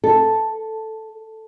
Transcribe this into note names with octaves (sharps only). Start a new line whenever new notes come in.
A4